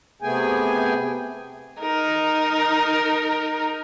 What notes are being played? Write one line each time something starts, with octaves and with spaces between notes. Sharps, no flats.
C3 A3 B3 G#4 G5 G#5
D#4 A#4